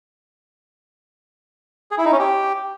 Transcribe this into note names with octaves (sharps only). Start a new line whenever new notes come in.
G#4
E4
D#4
C#4
G4